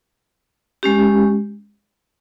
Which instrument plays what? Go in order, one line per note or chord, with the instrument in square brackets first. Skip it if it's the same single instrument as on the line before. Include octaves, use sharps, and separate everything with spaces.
[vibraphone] G#3 C#4 G4